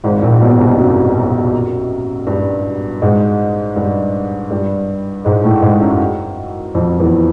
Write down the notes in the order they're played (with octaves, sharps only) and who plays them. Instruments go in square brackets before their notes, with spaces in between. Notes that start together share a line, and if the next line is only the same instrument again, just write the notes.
[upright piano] G#1 G#2
A#1 A#2
B1 B2
C2 C3
F#2 F#3
G2 G3
G#2 G#3
G2 G3
G2 G3
G#2 G#3
A2 A3
G#2 G#3
F#2 F#3
F2 F3
E2 E3